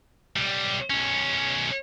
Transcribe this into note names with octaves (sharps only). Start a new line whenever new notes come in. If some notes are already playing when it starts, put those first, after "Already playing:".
B1 G3
B1 C#4